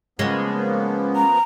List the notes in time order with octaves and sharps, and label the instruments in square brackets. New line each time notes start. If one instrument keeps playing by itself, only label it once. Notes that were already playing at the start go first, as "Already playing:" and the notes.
[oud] C#3 G#3 [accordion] F3 A#3 B3
[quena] A#5